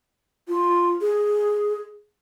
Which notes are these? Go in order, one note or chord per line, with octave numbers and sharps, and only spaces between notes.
F4
G#4